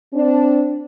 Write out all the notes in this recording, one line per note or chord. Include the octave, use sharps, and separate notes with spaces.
C4 D4